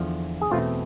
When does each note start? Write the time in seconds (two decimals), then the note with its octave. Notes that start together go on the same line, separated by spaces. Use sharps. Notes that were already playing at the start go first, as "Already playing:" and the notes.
Already playing: E2 D3 F3
0.41 G#4
0.50 E2 B2 A3 C4 F4